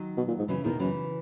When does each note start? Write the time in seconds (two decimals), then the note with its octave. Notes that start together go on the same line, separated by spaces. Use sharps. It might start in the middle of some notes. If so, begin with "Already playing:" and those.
Already playing: D#3 F#3
0.18 B2
0.28 A#2
0.39 G#2
0.48 F#2 C#3 E3
0.64 E2 B2 D#3
0.79 F#2 C#3 E3